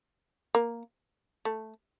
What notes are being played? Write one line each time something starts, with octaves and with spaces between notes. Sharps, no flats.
A#3
A3